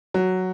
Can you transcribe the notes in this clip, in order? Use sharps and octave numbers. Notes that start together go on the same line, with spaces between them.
F#3